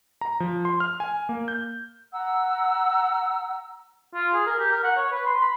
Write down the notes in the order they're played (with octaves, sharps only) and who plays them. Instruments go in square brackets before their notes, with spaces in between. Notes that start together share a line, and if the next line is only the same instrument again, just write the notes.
[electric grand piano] A#5
F3
C6
F6
G#5
A#3
G6
[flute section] F#5 A#5 E6
[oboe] F4
G#4
A#4
G4
A#4
F#5
C#5
B4
C6
B5